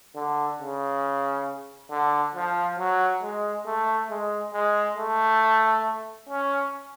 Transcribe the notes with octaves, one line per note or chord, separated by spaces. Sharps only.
D3
C#3
D3
F3
F#3
G#3
A3
G#3
G#3
A3
C#4